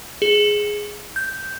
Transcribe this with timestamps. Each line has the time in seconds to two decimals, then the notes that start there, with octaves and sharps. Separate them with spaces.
0.22 G#4
1.16 G6